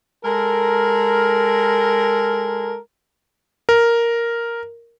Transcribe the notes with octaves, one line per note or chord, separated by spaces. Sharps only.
G#3 A4 A#4
A#4